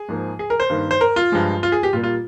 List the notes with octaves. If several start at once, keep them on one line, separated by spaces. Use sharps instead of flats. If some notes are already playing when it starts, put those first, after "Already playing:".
Already playing: G#4
G#2 F3 A#3
G#4
A#4
C5
G2 D#3 A#3
C5
A#4
F4
G2 F3 G#3
F4
G#4
G4
A#2 G3 A#3 F4
F4